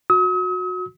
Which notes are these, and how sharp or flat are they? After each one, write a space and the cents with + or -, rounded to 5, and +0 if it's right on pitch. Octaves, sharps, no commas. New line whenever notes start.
F#4 -20 D#6 +45